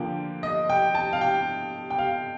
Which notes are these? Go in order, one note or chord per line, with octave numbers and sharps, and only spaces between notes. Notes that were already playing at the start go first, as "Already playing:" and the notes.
Already playing: D3 F3 A#3 G5
D#5
G5
A5
F5
G5
G5
F5